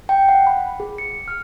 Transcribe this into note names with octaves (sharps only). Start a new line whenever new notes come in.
G5
F#5
B5
G#4
C#7
F6